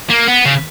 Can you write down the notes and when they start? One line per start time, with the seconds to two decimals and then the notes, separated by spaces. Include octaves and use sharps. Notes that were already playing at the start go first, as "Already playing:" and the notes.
0.10 A#3
0.28 B3
0.45 C#3